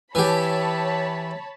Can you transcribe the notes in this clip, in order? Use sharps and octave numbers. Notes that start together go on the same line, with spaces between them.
E3 G4 C#5 A5 B5